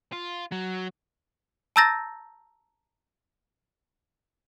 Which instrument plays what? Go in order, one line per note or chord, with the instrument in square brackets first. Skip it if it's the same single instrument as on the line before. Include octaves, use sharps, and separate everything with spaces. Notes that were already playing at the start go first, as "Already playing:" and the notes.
[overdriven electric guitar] F4
F#3
[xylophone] A5 A#5 E6 G6 A6 A#6